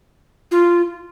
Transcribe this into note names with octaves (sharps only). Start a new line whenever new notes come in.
F4